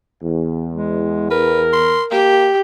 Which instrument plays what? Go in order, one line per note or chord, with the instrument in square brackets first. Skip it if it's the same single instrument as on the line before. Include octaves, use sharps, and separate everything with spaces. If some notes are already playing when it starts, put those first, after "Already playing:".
[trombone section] E2
[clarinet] G#3
[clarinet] A#4 [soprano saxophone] B4
[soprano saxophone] C6
[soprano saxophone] A#3 [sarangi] G4